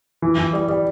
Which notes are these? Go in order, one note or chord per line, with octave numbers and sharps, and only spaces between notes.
E3
E3
G3
G3